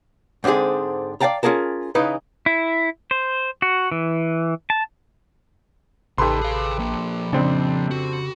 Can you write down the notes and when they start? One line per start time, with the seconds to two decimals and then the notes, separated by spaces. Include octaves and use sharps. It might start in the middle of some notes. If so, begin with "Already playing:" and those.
0.44 G#2 D3 C4 D4 G#4
1.21 D5 D#5 F5 G5 A5 A#5
1.43 C#4 F4 G#4 A#4 A5
1.95 C#3 E3 D#4 B4
2.46 E4
3.11 C5
3.62 F#4
3.92 E3
4.70 A5
6.18 A1 C#3 D#4 G4 A4 B4 C6
6.41 G#4 F5
6.78 F3 A#3
7.33 F2 C#3 C4 D4
7.91 F#4